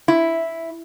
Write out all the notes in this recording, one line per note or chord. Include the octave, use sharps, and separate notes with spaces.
E4